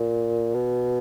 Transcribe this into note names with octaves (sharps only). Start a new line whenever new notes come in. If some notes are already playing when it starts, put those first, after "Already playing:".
Already playing: A#2
B2